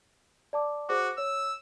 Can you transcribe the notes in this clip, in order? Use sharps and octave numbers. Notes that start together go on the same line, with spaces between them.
D5 A5 D6
F#4 G#4 C5 D6
C#5 E6